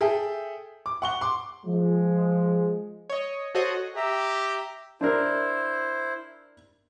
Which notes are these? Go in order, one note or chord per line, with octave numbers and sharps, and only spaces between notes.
G#4 A4 E5 G5
D6
F#5 C#6 G7
C6 D6
F3 G#3
C#5 D#5
F#4 A4 C5 C#5 D#5 F#5
G4 E5 A#5
D4 E4 A#4 C5